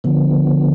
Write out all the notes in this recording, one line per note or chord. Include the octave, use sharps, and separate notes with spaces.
D3 F3 B3